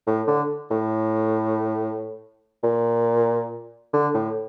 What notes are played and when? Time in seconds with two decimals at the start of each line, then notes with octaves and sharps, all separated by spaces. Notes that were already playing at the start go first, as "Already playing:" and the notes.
0.07 A2
0.27 D3
0.71 A2
2.63 A#2
3.93 D3
4.14 A2